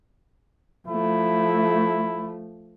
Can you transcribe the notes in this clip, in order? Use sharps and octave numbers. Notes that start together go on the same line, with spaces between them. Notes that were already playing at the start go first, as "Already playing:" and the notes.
F3 A3 E4